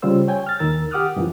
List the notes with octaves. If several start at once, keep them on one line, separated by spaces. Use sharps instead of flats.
C#3 G3 F4 C5 E6
C#5 G5 G#5 G6
F6 A6
D#2 D#3 A#4 E6 A6
G4 F#5 D6 D#6 F6 F#6
F#2 E3 F3